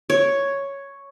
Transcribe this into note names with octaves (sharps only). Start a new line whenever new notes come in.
C#5